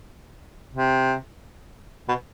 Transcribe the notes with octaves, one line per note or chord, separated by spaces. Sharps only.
C3
B2